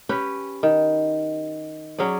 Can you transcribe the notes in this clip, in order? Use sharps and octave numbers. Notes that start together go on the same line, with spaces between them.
C#4 G4 B4
D#3
F#3 C#4 G#4 D5